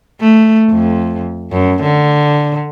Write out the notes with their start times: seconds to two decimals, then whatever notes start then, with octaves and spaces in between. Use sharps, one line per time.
0.21 A3
0.70 F2
1.52 F#2
1.83 D3